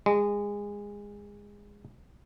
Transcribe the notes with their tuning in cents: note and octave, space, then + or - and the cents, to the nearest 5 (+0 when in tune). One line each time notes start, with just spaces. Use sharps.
G#3 -20